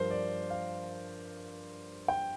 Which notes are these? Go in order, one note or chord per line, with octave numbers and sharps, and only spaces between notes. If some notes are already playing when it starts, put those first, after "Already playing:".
Already playing: G2 F3 A#4 C5
D5
F5
G5